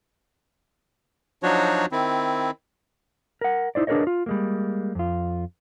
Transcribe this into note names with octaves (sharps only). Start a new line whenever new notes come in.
F3 F#3 D4 D#4 F#4 C#5
D#3 C4 E4
A#4 F#5
D#4 E4 C5 D5
D4 G#4 A#4 B4 C#5 D#5
F4
G3 G#3 A#3
F2 F4